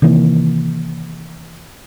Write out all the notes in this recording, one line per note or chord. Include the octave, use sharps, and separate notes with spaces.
C3 D#3 E3 A#3